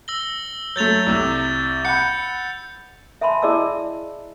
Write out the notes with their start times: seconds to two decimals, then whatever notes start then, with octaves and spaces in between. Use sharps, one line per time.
0.08 E6 A#6 G7
0.76 F#3 A3 G6 A6 F7
1.06 C2 C3
1.85 F#5 B5 G6 C#7
3.21 E5 G#5 A5 B5 C6
3.42 E4 G#4 D5 D#5 A5 E6